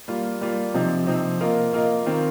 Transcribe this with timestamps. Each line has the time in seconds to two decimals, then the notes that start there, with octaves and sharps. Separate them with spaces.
0.08 G3 A#3 F4
0.41 G3 A#3 F4
0.74 C3 F3 C4 D#4
1.07 C3 F3 C4 D#4
1.40 A#3 F4 A#4 D#5
1.73 A#3 F4 A#4 D#5
2.06 D#3 C4 F4 A#4